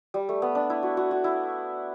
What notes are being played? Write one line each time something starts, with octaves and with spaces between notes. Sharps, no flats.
G3
A3
B3
D4
E4
F#4
F#4
F#4
E4